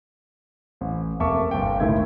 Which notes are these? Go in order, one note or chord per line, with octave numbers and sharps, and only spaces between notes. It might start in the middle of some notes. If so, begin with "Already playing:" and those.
A1
F1 A#3 E5 A5 C#6 D6
G1 G5
C#2 A2 D#3 D#4 E4 G#6